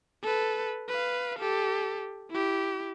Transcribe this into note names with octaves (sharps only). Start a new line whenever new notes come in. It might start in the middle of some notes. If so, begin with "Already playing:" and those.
A4 B4
B4 F5
G4 A4
E4 G4